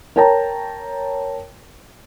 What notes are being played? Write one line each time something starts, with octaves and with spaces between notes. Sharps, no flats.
A#4 C#5 G5 A5 A#5